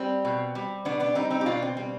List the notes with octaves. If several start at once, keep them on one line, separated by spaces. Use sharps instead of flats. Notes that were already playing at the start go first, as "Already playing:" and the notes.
Already playing: G3 C4
B2
G3
B2 B3 D4
B3 D4
G3 C4 D#4
C4 D#4
G4
B2 D4 F4
C4
G3 C4